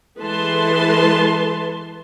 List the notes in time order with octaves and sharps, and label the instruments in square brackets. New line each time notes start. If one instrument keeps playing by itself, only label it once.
[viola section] E3 G#3 A4 B4 A5 C6